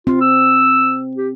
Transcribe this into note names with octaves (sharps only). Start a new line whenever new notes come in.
C4 F4
E6
G4